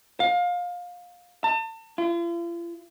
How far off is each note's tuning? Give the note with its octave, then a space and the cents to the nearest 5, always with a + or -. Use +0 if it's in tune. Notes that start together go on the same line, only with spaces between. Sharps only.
F5 +25
A5 +40
F4 -45